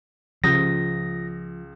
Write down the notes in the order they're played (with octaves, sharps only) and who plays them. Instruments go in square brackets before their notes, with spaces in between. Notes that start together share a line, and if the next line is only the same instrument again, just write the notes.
[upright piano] C#2 D#6 G6 [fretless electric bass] F3 [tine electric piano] A#6